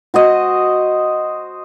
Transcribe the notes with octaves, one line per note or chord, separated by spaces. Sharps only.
F#4 C5 D#5